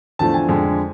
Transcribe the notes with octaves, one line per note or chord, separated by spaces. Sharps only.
E2 D3 F3 A3 A5
G#5
F2 D3 G#3